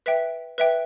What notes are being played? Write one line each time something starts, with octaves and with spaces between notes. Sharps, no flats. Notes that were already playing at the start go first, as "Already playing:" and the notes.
B4 E5 G5 B6
B4 E5 G5